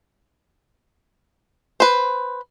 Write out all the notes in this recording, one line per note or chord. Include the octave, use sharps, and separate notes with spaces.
B4 C5